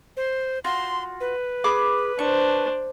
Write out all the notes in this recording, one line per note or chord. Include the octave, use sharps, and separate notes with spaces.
C5
F4 F#4 C6
B4
G#4 B5 D6
D4 C5 C#6